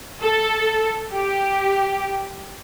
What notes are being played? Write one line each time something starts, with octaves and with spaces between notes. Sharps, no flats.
A4
G4